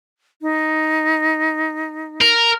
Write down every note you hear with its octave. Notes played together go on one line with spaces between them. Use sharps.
D#4
A#4